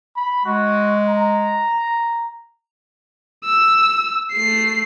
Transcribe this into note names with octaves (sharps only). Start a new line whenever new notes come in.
B5
G#3 F#4
A#5
E6
A3 C7